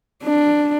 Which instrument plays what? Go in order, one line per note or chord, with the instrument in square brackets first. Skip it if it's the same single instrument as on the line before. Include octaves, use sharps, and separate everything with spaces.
[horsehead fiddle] D4